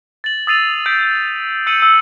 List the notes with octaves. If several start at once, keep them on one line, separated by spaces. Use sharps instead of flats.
A6 F#7
D#6 E6 A6 C7 D#7 F7
G6 B6 C7 D7 F#7
G6
E6 G6 C#7 D#7 F#7
E6 C#7